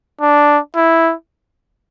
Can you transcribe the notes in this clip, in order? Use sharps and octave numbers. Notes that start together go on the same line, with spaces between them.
D4
E4